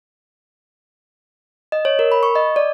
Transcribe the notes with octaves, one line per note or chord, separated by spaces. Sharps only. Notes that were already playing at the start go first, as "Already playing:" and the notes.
D#5
C#5
A#4
B5
C#6
D#5
D5